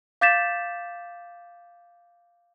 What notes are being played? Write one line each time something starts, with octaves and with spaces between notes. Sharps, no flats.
F5 D6 G6 A6 B6 E7